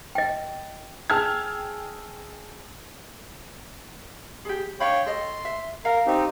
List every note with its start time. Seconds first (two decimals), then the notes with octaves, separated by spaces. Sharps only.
0.15 D#5 G5
1.10 G#4 G5 A5 E6 F6 G#6
4.45 G4 G#4
4.80 D4 C#5 F5 G5 B5
5.06 A4 D#5 C6
5.45 E5
5.85 A#4 F5
6.07 C4 D#4 G4